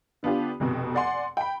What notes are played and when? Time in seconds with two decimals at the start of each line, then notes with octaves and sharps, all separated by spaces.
0.23 D3 B3 D4 F4 G4
0.60 F1 F2 B2
0.95 D5 F#5 G#5 C6
1.37 G5 B5